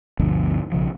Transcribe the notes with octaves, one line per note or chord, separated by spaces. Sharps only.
G1 D2 B2 F3
B1 C#3 F3